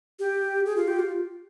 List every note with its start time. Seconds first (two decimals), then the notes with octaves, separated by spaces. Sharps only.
0.19 G4
0.66 G#4
0.77 F4
0.88 G4
0.99 F4